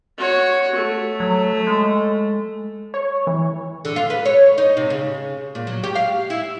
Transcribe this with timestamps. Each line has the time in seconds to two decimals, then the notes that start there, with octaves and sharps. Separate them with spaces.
0.18 F#4 C#5
0.75 A3
1.20 F#3
1.67 G#3
2.94 C#5
3.27 E3
3.85 D3
3.96 F4
4.10 B4
4.25 C#5
4.58 D#4
4.77 C3
4.90 C#3
5.55 A#2
5.67 F#3
5.84 G4
5.95 F5
6.30 E4